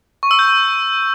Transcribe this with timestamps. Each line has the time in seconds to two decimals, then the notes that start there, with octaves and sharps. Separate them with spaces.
0.23 C#6
0.31 E6
0.39 G6